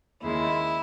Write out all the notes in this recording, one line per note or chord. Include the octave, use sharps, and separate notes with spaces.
D#2 C#3 G#3 E4